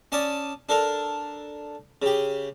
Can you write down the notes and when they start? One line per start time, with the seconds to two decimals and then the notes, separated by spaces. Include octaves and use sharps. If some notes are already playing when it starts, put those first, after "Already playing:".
0.12 C#4 D5 A5 D#6
0.69 D4 A4 A#4
2.02 C#3 G4